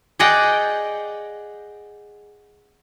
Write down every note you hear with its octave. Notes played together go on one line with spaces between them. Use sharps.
G#4 D5 D#5 F#5 G5